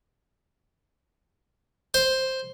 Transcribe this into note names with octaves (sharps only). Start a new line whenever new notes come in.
C5